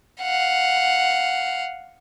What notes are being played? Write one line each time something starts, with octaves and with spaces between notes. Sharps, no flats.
F5 F#5